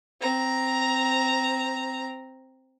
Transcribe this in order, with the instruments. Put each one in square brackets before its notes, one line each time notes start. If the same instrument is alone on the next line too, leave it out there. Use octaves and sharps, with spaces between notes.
[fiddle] C4 A#5